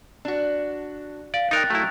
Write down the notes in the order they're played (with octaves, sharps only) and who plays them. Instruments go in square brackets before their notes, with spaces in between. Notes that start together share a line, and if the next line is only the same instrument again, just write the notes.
[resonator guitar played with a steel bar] D4 F#4
[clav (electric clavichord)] D5 [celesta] F5
[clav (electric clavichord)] D#4 A#4 [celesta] G5 F#6 A6
[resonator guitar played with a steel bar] F#3 [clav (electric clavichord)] A3 E4